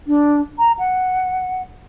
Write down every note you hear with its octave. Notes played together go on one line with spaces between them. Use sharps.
D4
A#5
F#5